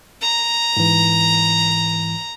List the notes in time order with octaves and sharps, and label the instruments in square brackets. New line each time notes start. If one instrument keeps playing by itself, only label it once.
[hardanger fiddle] A#5
[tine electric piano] G#2 E3